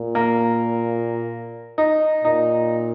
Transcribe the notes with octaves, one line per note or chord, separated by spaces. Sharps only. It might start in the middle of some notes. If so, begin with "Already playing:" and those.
Already playing: A#2
A#3
D#4
A#2 D#4